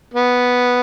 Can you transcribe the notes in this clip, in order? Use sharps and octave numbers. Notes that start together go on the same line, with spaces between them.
B3